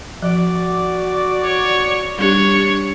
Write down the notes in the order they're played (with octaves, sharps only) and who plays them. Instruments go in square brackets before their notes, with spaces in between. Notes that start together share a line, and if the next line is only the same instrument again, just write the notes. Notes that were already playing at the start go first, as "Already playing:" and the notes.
[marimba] F3 [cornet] F#4 [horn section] D5
[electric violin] C#5
[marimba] G3 G4 [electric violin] D4 C#5